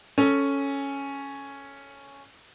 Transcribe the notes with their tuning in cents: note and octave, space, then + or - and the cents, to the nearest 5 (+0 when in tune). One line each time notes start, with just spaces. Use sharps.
C#4 +0 A4 +0